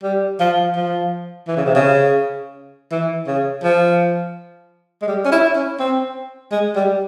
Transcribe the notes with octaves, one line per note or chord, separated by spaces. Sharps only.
G3
F3
F3
E3
C#3
C3
C#3
E3
C#3
F3
G#3
G3
C#4
E4
C#4
C4
G#3
G3